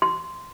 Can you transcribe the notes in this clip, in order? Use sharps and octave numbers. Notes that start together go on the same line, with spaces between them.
C6